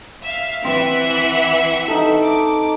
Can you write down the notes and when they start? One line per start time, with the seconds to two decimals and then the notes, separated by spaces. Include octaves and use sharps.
0.23 E5 F5
0.64 E3 C4 E5 F#5
1.88 D#4 A4
2.22 D6